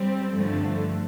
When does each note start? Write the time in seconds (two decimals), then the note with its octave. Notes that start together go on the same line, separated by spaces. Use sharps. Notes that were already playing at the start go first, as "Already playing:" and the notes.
Already playing: G3 C4
0.34 G2 D3 F3 A3